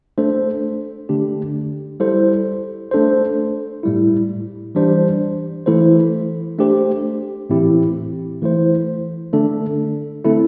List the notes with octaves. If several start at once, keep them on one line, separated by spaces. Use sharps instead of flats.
A3 D4 A4 C5
D3 A3 D4 G4
G3 E4 A4 C5
A3 D4 A4 C5
A2 G3 E4
E3 G3 D4 C5
E3 A3 E4 A4 C5
A3 D4 G4 C5
A2 E3 C4 E4 G4
E3 A3 E4 C5
D3 A3 D4 A4
D3 A3 C4 E4 A4